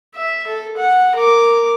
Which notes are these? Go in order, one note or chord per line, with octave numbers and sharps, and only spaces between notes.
E5
A4
F#5
A#4 D6